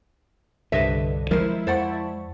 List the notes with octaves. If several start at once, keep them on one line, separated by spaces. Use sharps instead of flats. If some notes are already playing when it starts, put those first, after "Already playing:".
C2 G2 D3 B4 D#5 E5
F3 G#3 E4 A#4 C5
F2 C5 D5 F#5 A5 C#6